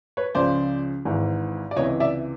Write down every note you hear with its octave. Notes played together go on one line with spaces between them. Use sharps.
B4 C#5
C#2 C#3 F3 C5 D5
G#1 G#2 E3
D5
C#2 C3 E3 C#5 D#5
D5 E5